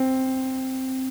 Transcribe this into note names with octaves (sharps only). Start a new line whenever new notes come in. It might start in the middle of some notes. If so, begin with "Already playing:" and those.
Already playing: C4